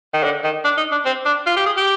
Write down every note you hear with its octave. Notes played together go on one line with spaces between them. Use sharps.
D#3
D3
D#3
D4
D#4
D4
C4
D4
F4
G4
G#4
G4